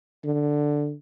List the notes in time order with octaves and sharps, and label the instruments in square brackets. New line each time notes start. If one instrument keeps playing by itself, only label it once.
[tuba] D3